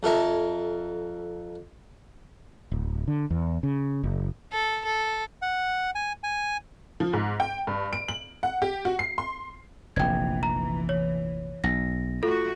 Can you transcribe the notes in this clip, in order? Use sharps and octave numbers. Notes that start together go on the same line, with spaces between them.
F2 A4 A#4 E5 A5
D1
D3
E2
C#3
F#1
A4
A4
F#5
G#5
G#5
F3
G#2
G5
G2
D7
F#7
F#5
G4
F#4
C7
C6
F1 A#1 E3 G5 G#6
A#5
C#5
B1 A#6
A3 F4 F#4 A4